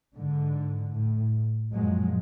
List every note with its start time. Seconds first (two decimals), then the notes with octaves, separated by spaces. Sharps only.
0.14 G#2 D3
0.92 A2
1.73 F#2 A#2 F3 F#3 G#3